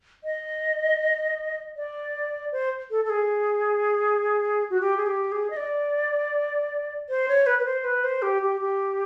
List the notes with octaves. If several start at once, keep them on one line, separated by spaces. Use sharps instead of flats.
D#5
D5
C5
A4
A4
G#4
F#4
G4
G#4
G4
G#4
D#5
D5
C5
C#5
B4
B4
C5
B4
C5
G4
G4
G4